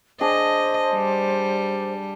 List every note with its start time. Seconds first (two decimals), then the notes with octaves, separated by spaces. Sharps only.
0.21 D4 G#4 C5 D#5
0.93 G3